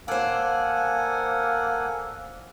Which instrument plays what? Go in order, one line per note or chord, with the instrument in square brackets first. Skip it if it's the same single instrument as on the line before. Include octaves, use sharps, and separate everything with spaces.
[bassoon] A#3 [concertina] A4 F#5 G#5 [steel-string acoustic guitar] C5 D5